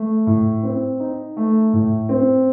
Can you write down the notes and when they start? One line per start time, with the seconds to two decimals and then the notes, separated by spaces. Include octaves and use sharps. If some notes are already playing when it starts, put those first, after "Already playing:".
Already playing: A3
0.27 A2
0.63 C4
1.00 D#4
1.37 A3
1.73 A2
2.09 C4